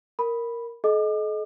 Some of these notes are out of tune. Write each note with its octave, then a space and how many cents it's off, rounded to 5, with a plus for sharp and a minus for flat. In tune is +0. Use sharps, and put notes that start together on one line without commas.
A#4 +0 B5 -5
A4 -45 D#5 +0 D6 +35